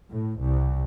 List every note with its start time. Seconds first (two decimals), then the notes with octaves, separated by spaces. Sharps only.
0.12 A2
0.42 C2